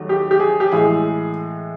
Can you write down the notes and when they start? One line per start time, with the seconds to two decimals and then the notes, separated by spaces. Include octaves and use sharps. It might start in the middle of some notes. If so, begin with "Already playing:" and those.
Already playing: D#2 D#3 F#3 A3
0.09 G4
0.31 G4
0.40 G#4
0.60 G4
0.72 A2 E3 G#3 G#4